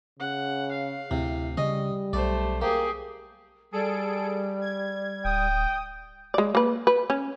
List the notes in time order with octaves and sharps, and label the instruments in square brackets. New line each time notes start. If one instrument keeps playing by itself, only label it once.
[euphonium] C#3 [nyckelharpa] F#5
[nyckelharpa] F5
[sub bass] D2 [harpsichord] C3 [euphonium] E4
[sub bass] C#3 [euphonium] G3 [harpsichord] C#4 D#5
[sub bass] B1 [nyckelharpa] A3 C5 [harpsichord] D5
[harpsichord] A#3 [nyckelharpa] G4 G#4
[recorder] G3 [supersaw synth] G#4 A4 D7
[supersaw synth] G#6
[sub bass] D1 [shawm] G5 [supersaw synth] D#6
[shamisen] G#3 D5
A#3 B4
B4
C#4